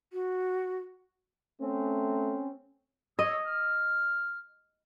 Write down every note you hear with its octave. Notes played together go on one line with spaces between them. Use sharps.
F#4
A3 C4 C#4
G#4 C#5 D#5 E6
F6